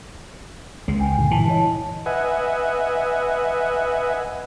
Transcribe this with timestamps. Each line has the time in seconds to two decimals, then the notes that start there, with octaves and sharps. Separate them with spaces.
0.88 C#2 G#3
1.00 G5 G#5
1.18 G2 A#2 D3
1.31 E3 A5
1.48 E4 C#5 D#5
2.06 B4 D#5 E5 F#5 G#5